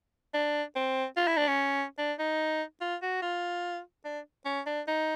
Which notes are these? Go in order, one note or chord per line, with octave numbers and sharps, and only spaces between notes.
D4
C4
F4
E4
D4
C#4
D4
D#4
F4
F#4
F4
D4
C#4
D4
D#4